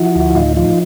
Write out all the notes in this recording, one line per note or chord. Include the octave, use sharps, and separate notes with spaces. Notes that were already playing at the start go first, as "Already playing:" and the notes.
Already playing: F3 E4 F#4
D2
A2 D#4 F4
F3 D#4 F4